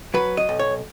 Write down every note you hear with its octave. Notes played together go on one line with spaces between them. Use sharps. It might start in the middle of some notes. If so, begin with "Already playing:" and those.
F#3 B4
D#5
B1
C#5